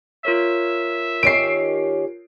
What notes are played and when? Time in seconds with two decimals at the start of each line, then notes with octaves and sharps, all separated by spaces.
0.25 F4 A#4 C#5 E5
1.23 D#3 C#4 G4 C7 D7